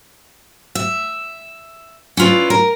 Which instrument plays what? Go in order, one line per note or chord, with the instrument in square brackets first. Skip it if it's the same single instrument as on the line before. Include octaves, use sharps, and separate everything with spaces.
[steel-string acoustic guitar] E5
C#4 E4 F4 B4 D5
A#4